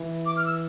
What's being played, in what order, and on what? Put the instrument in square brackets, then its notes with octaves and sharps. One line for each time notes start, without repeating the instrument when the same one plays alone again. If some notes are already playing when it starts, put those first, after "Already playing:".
Already playing: [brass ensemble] E3
[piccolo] D6
F6
E6